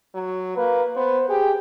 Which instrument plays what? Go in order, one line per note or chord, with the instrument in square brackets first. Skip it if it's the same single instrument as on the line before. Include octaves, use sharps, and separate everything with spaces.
[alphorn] F#3
[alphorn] A#3 [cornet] B4
[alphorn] B3 [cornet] C5
[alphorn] G4 [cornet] G#4